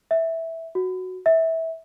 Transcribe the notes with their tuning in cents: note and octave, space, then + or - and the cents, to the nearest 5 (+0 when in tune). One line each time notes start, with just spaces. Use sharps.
E5 -10
F#4 +0
E5 -20